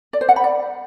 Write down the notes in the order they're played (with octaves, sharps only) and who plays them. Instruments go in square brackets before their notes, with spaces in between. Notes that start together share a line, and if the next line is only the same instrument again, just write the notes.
[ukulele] D5
C5
F#5
B5
D5